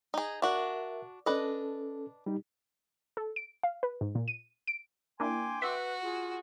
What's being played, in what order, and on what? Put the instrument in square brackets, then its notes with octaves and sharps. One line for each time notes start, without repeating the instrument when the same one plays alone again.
[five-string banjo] D#4 G#4
[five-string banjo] D4 F#4 [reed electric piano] A#4 E5
[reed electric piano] C#4 A4 [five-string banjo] D4 B4 D#5
[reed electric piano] G3 D#4 G4
[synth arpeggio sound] A4
D7
F5
B4
G#2
A#2
D#7
D7
[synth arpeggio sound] A#3 D4 E4 [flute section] G5 C6 D6 [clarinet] G#5
[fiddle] F#4 [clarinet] B4 [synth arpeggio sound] E5
[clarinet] F4 [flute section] G#4